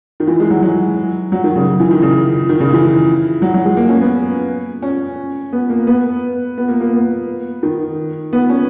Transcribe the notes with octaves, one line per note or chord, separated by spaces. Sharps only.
D#3
E3
G#3
F#3
F#3
F#3
D#3
C#3
E3
D#3
C#3
D#3
C#3
E3
F#3
F#3
G#3
A#3
C#4
B3
C#4
B3
A#3
B3
B3
A#3
A#3
B3
D#3
B3
C#4